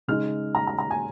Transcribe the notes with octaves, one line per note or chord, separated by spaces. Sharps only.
C#3 G#3 D#4 F6
A#5
A#5
A#5
G#5